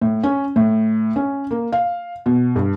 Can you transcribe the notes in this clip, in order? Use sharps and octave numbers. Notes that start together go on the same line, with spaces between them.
A2
C#4
A2
C#4
A#3
F5
B2
G2